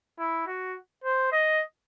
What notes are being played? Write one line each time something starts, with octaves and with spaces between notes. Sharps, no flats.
E4
F#4
C5
D#5